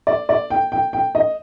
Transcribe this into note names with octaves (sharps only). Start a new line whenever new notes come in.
D5
D5
G5
G5
G5
D#5